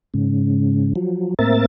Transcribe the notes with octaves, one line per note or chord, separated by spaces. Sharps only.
G#2 C#3
F3 F#3
A2 A#3 C4 A#4 E5 A6